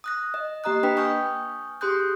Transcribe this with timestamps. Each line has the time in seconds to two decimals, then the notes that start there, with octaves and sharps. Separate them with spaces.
0.04 D#6 F#6 A#6
0.34 D#5
0.64 A#3 G4 D#5 A#5 D#6 F#6
0.83 A#3 D4 B4 G5 B5 B6
0.97 G#5 C#6 D#6 F6 G6
1.81 G4 G#4 C6 D#6 F#6 G6